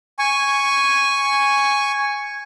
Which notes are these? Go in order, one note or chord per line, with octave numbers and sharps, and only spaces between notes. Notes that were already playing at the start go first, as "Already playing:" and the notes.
G#5 C#6